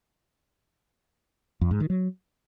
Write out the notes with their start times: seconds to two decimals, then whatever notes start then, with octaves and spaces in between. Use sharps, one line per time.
1.61 F2
1.71 G#2
1.80 D#3
1.90 F#3